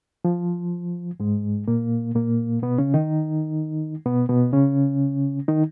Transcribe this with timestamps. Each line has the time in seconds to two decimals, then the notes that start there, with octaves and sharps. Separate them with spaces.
0.25 F3
1.20 G#2 G#3
1.68 A#2 A#3
2.15 A#2 A#3
2.62 B2 B3
2.78 C#3 C#4
2.94 D#3 D#4
4.05 B2 B3
4.29 B2 B3
4.53 C#3 C#4
5.48 D#3 D#4